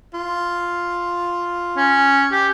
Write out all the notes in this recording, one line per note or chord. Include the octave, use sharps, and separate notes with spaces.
F4
C#4
G4